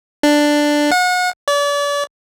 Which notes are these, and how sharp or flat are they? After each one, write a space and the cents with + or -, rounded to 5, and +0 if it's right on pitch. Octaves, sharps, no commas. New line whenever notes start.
D4 +5
F#5 -35
D5 -40